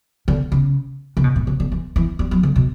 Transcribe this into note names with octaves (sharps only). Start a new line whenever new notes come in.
D3
C#3
C#3
B2
A2
C#3
D3
E3
E3
G3
F#3
D3
B2